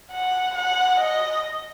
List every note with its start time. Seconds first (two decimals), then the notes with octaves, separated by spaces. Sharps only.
0.11 F#5
0.55 F#5
1.00 D#5